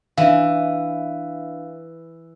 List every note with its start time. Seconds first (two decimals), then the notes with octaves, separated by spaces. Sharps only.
0.18 E3 D4 E5 F5